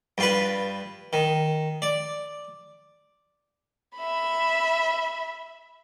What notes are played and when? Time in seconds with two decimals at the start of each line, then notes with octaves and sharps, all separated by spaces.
0.18 G2 F4 B4
1.13 D#3
1.82 D5
3.97 E5 B5